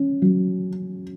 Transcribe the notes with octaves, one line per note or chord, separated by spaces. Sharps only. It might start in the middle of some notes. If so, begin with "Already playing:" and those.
Already playing: C#4
F#3